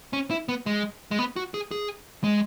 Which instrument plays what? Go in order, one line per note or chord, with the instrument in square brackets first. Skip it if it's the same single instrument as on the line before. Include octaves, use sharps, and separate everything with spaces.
[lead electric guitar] C#4
E4
B3
G#3
G#3
B3
F#4
G#4
G#4
G#3